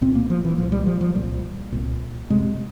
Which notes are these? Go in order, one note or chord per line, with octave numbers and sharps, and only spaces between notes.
C2 A#2 C4
A#3
F3
E3
C2 A#2 F3
G3
F3
F3
C2 A#2 G3
C2 A#2
F2 C3 G#3